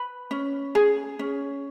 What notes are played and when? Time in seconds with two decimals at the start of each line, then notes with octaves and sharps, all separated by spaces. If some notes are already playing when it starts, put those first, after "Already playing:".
Already playing: B4 B5
0.31 C#4
0.75 G#4
1.19 C#4